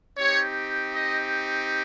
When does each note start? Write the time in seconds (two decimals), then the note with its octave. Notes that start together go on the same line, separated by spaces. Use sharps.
0.16 C4 D#4 G4 C#5
0.92 D#5